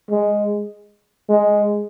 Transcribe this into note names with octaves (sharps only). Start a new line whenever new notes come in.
G#3
G#3